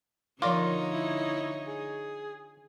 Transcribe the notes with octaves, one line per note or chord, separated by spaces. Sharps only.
D3 F3 D#4 F4 A#4 C#5 D5 D6
E4
G#4